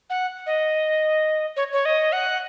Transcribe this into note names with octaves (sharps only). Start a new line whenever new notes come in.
F#5
D#5
C#5
C#5
D#5
F#5